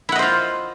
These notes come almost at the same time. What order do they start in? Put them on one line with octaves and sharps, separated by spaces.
E4 F#5 D#5 C5 F4